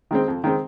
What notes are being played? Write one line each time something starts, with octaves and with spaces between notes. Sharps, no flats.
D#3 G#3 C4
F2
D#3 G#3 C4